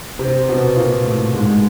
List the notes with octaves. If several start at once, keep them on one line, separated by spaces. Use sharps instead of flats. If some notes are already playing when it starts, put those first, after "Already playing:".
C3 C4
B2 B3
A#2 A#3
A2 A3
G#2 G#3